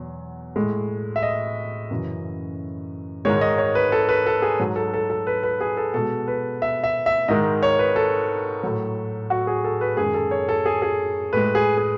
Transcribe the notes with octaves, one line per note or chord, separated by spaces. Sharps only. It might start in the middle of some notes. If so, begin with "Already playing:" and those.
Already playing: E2 B2 F#3
A2 G#3
E5
D#5
F#2 C#3 E3
G#2 D#3 G#3 C#5
D#5
C#5
B4
A4
B4
A4
G#4
G#2 F#3
A4
A4
A4
B4
B4
G#4
A4
B2 G#3 A4
B4
E5
E5
E5
G#2 D#3 G#3 D#5
C#5
B4
A4
A2 F#3
F#4
G#4
A4
B4
F#2 D#3 G#3 G#4
A4
C#5
A4
G#4
G#4
A2 G#3 B4
G#4
G#4